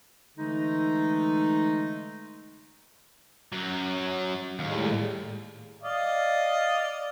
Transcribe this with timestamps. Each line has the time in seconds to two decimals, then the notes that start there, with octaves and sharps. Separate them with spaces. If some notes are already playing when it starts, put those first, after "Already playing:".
0.37 D3 E3 G#3 A3 D#4
3.52 F#2 F#3
4.59 D#2 A2 G3 G#3
5.83 D5 D#5 F5